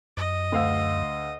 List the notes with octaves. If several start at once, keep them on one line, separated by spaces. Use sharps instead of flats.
F#2 D#5
D2 F5 E6